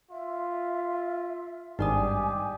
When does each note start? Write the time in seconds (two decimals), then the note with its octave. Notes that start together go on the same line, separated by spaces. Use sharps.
0.11 F4 E5
1.79 G#1 G2 D#4 G4 D5 G#5 D#6